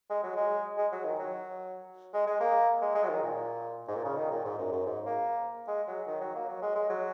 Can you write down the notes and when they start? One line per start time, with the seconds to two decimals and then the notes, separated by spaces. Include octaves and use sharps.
0.10 G#3
0.23 F#3
0.37 G#3
0.78 G#3
0.92 F#3
1.05 D#3
1.19 F#3
2.14 G#3
2.27 G#3
2.40 A#3
2.82 G#3
2.95 G#3
3.04 F#3
3.09 D#3
3.22 A#2
3.88 G#2
3.96 A#2
4.04 C#3
4.17 D#3
4.31 A#2
4.44 G#2
4.58 F#2
4.72 F#2
4.86 G#2
5.06 A#3
5.68 G#3
5.87 F#3
6.07 D#3
6.21 F#3
6.35 A#3
6.49 F#3
6.62 G#3
6.75 G#3
6.90 F#3